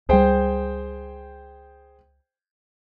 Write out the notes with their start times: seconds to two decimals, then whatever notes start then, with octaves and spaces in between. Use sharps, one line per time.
0.09 C#2 G3 G#4 C5 G5